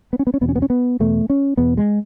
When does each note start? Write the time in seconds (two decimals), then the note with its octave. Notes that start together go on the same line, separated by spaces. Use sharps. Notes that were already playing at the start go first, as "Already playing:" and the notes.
0.13 B3
0.19 C#4
0.27 B3
0.34 C#4
0.41 E2 B2 B3
0.49 C#4
0.56 B3
0.62 C#4
0.70 B3
1.00 E2 B2 A3
1.30 C#4
1.57 E2 B2 B3
1.77 G#3